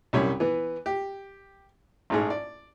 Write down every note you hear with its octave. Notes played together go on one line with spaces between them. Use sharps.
C2 F#2 G3 C#5
E3 B3
G4
A1 G#2 G#4
D5